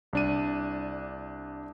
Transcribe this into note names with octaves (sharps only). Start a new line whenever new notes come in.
C2 D4 D#7